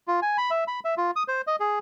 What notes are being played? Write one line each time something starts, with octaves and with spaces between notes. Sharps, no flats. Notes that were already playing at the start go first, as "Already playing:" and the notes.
F4
G#5
B5
E5
B5
E5
F4
D#6
C5
D#5
G#4